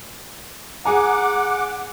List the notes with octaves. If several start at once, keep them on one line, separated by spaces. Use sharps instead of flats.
G#4 F#5 G#5 A#5 D6